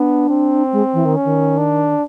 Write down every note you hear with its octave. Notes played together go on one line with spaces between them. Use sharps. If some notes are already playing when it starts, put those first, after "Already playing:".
Already playing: B3 D4
C4
G#3
E3
D#3
C#4
D#3
D4